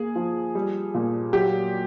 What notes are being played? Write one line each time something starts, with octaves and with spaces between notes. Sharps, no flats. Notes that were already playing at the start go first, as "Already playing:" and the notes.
Already playing: A#3 G#4
F3
G3
A#2
F#3 G4